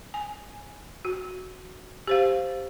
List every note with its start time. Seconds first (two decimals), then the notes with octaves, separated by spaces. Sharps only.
0.14 G#5
1.05 F#4
2.07 G4 C5 F5